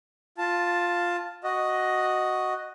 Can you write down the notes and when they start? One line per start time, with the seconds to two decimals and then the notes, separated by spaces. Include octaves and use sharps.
0.38 F4 A5
1.44 F#4 D#5